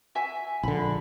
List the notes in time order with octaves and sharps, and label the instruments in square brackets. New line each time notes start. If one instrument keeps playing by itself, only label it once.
[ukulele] F#4 E5 G#5
[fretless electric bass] A#1 D3 [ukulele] B5